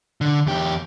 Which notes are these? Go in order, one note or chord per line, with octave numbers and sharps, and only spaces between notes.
D3
E2 G4